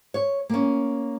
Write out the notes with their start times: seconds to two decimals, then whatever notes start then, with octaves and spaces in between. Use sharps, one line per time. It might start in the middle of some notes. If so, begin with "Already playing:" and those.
0.14 C#5
0.49 A#3 C#4